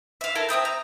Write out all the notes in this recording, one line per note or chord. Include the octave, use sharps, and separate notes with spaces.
E5 F5
E4 A4 A#4
C4 E5 D#6 G6
A#5